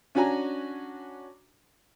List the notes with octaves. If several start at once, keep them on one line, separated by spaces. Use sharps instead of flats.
C#4 D4 F#4 G#5 A#5